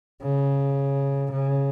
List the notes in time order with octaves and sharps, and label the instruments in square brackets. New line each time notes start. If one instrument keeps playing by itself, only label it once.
[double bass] C#3
C#3